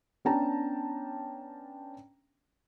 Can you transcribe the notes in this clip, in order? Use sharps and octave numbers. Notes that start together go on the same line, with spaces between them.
B3 C#4 D4 G5 A5 A#5